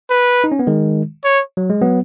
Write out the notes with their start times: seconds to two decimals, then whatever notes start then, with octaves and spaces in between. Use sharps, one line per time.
0.10 B4
0.44 D#4
0.52 C#4
0.59 B3
0.67 D#3 G#3
1.24 C#5
1.57 F#3
1.70 G#3
1.82 F#3 B3